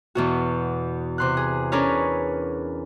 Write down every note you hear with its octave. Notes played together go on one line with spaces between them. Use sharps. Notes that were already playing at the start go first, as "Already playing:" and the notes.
E2 B2 F#4
C3 C6 F#6
G#4
C#4 D4 G#4 A#4 B4 C#5